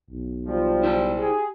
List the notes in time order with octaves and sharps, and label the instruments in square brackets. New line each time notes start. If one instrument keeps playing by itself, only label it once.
[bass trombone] B1
[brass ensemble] F3 [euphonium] G3
[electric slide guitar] E4 C5
[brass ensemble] G4 G#4